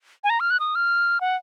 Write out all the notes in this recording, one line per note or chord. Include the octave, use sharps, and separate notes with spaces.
G#5
A#5
F6
F#6
D#6
F6
F#5